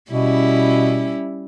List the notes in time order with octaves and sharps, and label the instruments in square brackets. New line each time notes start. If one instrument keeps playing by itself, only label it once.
[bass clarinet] B2 [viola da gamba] G3 C#4 E4